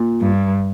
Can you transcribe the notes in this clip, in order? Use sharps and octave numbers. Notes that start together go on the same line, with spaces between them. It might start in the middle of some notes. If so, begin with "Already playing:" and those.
Already playing: A#2
G2